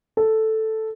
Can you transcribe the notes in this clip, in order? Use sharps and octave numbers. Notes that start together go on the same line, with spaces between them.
A4